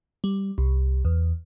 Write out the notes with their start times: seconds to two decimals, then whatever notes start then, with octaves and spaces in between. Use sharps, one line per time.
0.24 G3
0.58 C2
1.05 E2